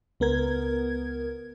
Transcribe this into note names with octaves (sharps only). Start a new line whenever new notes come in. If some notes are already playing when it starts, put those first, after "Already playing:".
C#2 B3 A#4 G#6